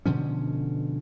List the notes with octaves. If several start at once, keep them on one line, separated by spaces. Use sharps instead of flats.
B2 D3 F3 C#4